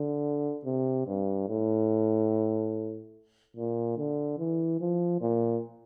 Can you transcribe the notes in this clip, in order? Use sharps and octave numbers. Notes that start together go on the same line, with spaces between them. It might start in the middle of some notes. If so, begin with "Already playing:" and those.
Already playing: D3
C3
G2
A2
A#2
D3
E3
F3
A#2